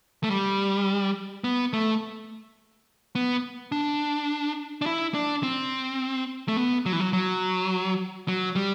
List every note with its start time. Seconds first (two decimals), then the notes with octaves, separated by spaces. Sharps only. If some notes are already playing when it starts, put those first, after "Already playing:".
0.23 A3
0.30 G3
1.44 B3
1.73 A3
3.15 B3
3.72 D4
4.81 D4
4.86 E4
5.14 D4
5.43 C4
6.48 A3
6.57 B3
6.86 F#3
6.93 E3
7.00 F#3
7.13 F#3
8.28 F#3
8.55 G3